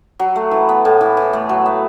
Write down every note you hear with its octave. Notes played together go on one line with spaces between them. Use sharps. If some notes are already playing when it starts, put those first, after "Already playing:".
F#3
A3
E3
B3
A2
E3
E3
A3
F#3
B3